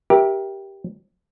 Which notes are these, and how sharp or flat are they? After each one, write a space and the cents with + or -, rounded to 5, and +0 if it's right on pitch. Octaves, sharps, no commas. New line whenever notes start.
G4 +0 A#4 +25 E5 +0